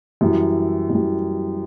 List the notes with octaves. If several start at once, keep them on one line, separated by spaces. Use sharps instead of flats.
F#2 E3 G3
F#2 E3 G3